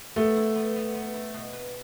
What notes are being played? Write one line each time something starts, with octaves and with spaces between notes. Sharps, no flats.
A3 B3
E4
B3
B3
B3
E4
B2
B4